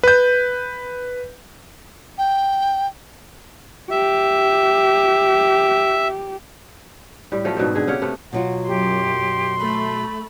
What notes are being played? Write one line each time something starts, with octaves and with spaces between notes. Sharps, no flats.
B4 G6
G5
G4 E5
A2 G3
F3 F#3 A3 C#4
G#2 B2 G3 C4
D3 G#4
C#3 C#4 G4 F#5
C3 A3 B3
B2 F#3 F4 F#5
F#2 G4 C6
A3 B5